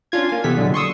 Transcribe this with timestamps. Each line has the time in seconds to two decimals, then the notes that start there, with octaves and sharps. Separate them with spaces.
0.12 C#4 D4 F4 G#6
0.29 A#3 G#5
0.44 C3 E3 B3 G4 A4 B6
0.57 A#2 D3 F#3 G#3 D4
0.74 C6 C#6 D#6 E6